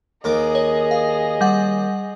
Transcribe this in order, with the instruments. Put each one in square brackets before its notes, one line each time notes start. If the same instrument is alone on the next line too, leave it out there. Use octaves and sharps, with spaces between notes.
[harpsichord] D#2 A#4 D6 [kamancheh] G#4 D#5
[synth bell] C#5
F5
G3 F#5